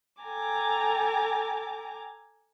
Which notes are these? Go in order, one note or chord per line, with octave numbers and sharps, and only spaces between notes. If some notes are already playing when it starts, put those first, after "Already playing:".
A4 G5 G#5 A#5 D6